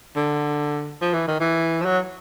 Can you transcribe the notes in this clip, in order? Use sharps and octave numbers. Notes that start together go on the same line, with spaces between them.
D3
F3
E3
D#3
E3
F3
F#3